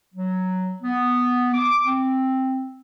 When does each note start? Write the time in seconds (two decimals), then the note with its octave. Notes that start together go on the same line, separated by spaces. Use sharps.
0.14 F#3
0.81 B3
1.53 D6
1.86 C4